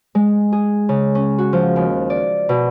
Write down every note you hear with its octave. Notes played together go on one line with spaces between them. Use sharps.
G#3
G#4
C#3
C#4
F#4
F3
D#2
D5
B2